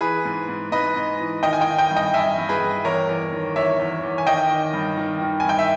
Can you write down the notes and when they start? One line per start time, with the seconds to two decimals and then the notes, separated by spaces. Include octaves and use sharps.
0.01 E3 G#4 B4
0.25 G#2
0.48 G#2
0.72 G#2 B4 D#5
0.96 G#2
1.20 E3
1.43 D#3 D#5 G5
1.53 G#5
1.61 D#5 G5
1.67 D#3
1.78 D#5 G5
1.91 G2
1.97 D#5 G5
2.14 G2 E5 G#5
2.38 G2
2.49 G#4 B4
2.61 G2
2.85 E2 A#4 C#5
3.09 E2
3.32 D#3
3.56 E2 C#5 E5
3.79 E2
4.03 E2
4.18 G#5
4.27 D#3 D#5 G5
4.51 D#3
4.74 G2
4.97 D#3
5.21 D#3
5.40 G#5
5.45 G2 G5
5.59 E5